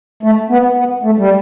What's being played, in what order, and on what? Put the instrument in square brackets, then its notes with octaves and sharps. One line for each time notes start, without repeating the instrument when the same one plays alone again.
[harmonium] A3
B3
B3
A3
G3